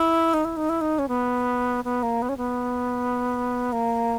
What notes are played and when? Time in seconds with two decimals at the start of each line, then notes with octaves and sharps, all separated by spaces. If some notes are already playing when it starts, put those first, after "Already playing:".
Already playing: E4
0.34 D#4
0.45 E4
0.57 D#4
0.69 E4
0.81 D#4
0.99 C#4
1.08 B3
1.85 B3
2.03 A#3
2.22 B3
2.29 C#4
2.37 B3
3.72 A#3